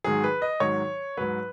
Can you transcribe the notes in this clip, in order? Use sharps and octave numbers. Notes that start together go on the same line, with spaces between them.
G#2 D#3 F#3 G#4
B4
D#5
G#2 D#3 F#3 C#5
G#2 F#3 B4